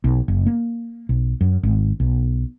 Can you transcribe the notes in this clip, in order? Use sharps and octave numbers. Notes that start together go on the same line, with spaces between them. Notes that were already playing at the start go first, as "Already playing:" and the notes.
B1
F#1
A#3
B1
F#2
G#1
B1